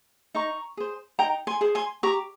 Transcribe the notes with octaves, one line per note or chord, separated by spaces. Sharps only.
D#4 A#5 C#6
G#4 C5
D#4 G5 A#5
G#5 C6
G#4 C5
G#5 C6
G4 A#5 C#6